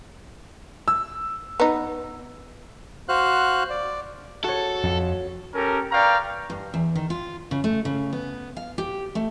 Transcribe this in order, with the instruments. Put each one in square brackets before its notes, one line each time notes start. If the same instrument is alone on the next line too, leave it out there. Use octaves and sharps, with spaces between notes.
[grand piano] E6
[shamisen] B3 D#4
[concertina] F#4 C5 F5 F#6
D5
[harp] F#4 C#5 [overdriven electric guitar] A4
[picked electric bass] F2
[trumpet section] C#4 G4 A4 A#4
B4 D5 F5 G5 A#5 C#6
[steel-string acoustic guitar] G2
E2
D#3
F4
C#3
A3
C#3
B3
F5
G4
A3